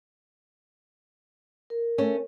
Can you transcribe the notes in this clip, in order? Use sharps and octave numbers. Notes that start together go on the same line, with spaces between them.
A#4
A3 C#4